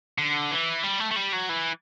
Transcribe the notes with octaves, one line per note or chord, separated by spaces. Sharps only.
D3
E3
G3
A3
A3
G3
F#3
E3